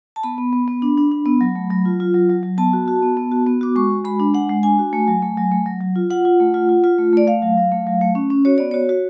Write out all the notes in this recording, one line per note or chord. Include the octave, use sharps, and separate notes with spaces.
A5
B3 B5
B3
B3
B3
D4
D4
D4
B3
F#3
A3
F#3
F4
F4
F#3
F#3
F#3
B3 A5
F#4
F#4
B3
B3
F#4
B3
F#4 D6
G#3 C#6
F#4
G#3 B5
D4
G#3 F#5
G#3
D4 G#5
F#4
A3
F#3
A3
F#3
A3
F#3
F#3
F4
F4 F#5
F4
A3
F4
F4
F4
A3
A3 D5
A3 F5
F#3
F#3
A3
F#3
A3
C#4
C#4
F#4 C#5
B3 D5
F#4 C#5
F#4